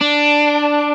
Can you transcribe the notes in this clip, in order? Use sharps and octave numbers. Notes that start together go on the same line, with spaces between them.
D4